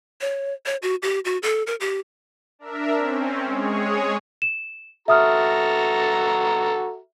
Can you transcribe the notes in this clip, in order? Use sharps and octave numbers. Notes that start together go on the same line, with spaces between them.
C#5
C#5
F#4
G4
F#4
A4
A#4
G4
D4 A#4 E5
C4 C#4
G#3 G#4 C#5
E7
F#4 A4 E5 A#5 D#6 F6